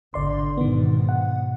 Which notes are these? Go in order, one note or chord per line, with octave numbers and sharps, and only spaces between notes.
G#1 D3 D5 C6
G#2 B2 D#3 B3
F#5